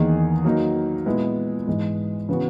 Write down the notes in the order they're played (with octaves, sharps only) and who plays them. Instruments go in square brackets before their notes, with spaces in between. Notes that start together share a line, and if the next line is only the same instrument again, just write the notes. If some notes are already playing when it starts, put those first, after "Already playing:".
Already playing: [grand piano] E2 D#3 A#3 D#4 G#4
F#3 A#3 D#4
A#2 G#3 B3 E4
G#2 E3 G#3
C#3 E3 B3 F#4